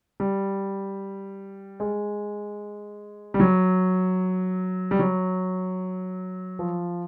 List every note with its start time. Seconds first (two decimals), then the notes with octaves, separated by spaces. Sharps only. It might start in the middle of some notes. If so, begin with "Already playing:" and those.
0.20 G3
1.80 G#3
3.34 G3
3.40 F#3
4.91 G3
4.99 F#3
6.59 F3